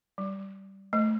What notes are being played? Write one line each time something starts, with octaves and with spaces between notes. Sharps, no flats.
G3
A3